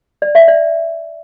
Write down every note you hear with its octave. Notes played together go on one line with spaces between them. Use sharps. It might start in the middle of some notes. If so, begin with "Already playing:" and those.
D5
E5
D5